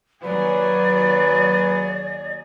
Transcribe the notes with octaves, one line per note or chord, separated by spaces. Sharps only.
D#2 F#3 G#4 B4 D5